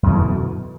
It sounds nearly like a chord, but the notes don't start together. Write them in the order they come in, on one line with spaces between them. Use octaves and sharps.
F#2 B2 E3 D3